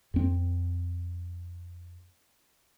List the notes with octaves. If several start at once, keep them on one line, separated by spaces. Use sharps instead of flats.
F2 C4